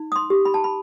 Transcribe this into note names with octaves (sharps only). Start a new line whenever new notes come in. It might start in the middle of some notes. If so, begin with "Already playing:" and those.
Already playing: D#4
D#6
C6
G4
B5
A5
B5